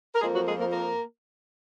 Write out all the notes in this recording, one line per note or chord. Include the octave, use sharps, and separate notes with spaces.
A#4
F2 F3 G#3 A#3 G#4
F#3 F#4
G#3 G#4
A#3 A#4
A#3 A#4